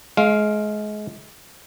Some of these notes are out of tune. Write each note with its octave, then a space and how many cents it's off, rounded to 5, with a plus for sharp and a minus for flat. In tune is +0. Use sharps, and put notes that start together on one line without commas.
G#3 +30 F5 +0